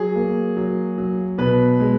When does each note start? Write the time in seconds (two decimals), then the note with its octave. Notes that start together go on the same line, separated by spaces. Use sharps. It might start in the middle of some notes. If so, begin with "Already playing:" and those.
Already playing: F#3 G#4
0.15 A#3
0.57 F#3
0.98 F#3
1.38 B2 B4
1.80 G#3